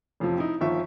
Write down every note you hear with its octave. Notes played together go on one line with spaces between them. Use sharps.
A1 F2 C3 F3
D#4 E4
G1 D#3 F3 E5 C#6